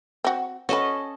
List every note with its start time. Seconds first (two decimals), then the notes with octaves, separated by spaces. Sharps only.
0.24 C4 F#4
0.69 C#4 F#4 A4 B4 D#5